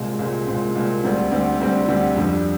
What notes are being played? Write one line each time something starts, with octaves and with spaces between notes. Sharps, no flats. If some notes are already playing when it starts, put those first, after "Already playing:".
Already playing: C2 A#2 G#3 C4
C2 A#2 G#3 C4
C2 A#2 G#3 C4
C2 A#2 G#3 C4
D2 D3 G3 C4
D2 D3 G3 C4
D2 D3 G3 C4
D2 D3 G3 C4
F2 D3 G3